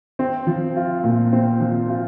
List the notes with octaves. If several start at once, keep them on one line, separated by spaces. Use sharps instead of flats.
C4
F3
F4
A#2
C4
F3
F4